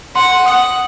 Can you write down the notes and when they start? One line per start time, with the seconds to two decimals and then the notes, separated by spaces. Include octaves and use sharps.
0.15 F#5 C6
0.31 C6
0.46 F#5 D#6